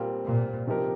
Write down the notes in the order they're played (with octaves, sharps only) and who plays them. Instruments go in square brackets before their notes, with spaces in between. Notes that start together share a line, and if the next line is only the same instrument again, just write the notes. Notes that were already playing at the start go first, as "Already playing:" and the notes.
Already playing: [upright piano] A#2 G3 C4 F4 A#4
[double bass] A#2
[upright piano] C3 F3 D#4 G4 A#4